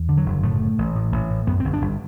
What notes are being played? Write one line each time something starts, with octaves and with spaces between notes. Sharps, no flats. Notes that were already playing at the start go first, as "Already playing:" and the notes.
Already playing: E2
D3
F#3
F#1
A2 A3
A2
A1
A2
A1
A2
F#2 B3
G1 C4
D4
G1